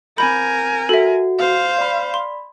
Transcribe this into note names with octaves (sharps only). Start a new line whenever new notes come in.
C4 A#4 G#5 B5 G6
F#4 A4 E5
C5 F5
D5 B5
C6